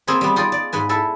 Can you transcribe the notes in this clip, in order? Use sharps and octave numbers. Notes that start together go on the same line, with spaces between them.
A#3 C4 F4 G#4 C#5 B5
G3 B3
D#4 F4 G#4 D5
D5
G#2 B4 G#5
E4 A4 B4